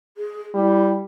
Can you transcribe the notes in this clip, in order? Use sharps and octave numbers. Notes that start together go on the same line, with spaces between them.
G#4
G3 E4